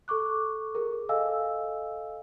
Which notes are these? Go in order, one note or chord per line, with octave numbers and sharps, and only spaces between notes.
A4 C#6 D6 F#6
G#4 A#4
A4 D#5 F5 G#5 E6